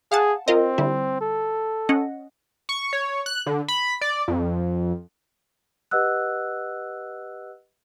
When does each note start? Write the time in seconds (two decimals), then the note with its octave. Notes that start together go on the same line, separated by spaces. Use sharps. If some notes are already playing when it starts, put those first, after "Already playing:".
0.12 G#4 F5 F#5 A5
0.48 C4 F4 A#4 D#5
0.78 D3 G3 E4
1.21 A4
1.89 C#4 D#5 F#5
2.69 C#6
2.93 C#5
3.26 F#6
3.46 D3
3.68 B5
4.01 D5
4.28 F2
5.91 G4 B4 D#5 F#5 E6 F#6